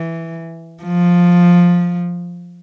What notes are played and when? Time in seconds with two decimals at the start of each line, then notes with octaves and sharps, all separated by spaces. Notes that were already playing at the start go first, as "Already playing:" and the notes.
Already playing: E3
0.83 F3